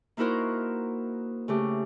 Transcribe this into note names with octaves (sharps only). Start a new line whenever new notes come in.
A#3 D#4 E4 F#4 A#4 C5
C#3 A3 G4